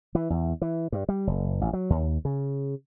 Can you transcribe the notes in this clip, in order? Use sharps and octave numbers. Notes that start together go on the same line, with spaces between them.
E3
E2
E3
G2
G3
F#1
A1
F#3
D#2
C#3